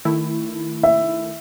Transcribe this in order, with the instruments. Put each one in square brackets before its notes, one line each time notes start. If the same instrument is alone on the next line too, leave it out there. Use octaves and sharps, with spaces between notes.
[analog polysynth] D#3 A3 E4
[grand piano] E5